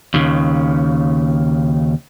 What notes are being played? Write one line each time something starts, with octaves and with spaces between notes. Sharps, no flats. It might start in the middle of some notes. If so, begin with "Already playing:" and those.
D#2 C#3